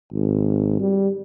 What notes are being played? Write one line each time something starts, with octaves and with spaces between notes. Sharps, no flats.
G#1
G3